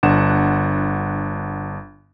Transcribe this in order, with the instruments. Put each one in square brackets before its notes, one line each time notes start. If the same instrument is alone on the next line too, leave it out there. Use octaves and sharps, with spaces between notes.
[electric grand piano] G1 D4 F#5 E7